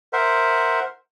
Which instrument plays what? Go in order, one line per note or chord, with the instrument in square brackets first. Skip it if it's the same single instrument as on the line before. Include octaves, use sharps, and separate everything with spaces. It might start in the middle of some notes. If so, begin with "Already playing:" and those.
[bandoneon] A#4 C5 E5 F#5